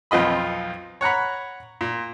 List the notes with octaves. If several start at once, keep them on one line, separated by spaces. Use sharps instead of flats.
B1 F2 C4 F4 D#5 B5
C#5 F#5 A#5 B5
A#2